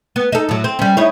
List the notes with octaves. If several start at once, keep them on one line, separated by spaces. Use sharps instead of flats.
B3
D#4 A4
A2 F#3
C4
G3 C#4
D#4 E4 C#5